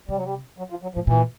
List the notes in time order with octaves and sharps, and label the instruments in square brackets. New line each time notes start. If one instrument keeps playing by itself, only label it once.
[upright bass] C3 [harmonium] G3
[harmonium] F#3
G3
F#3
F3
F#3
[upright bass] A2 [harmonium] F3
[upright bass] A#2 [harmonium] E3